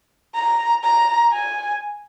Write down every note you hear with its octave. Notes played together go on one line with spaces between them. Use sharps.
A#5
A#5
G#5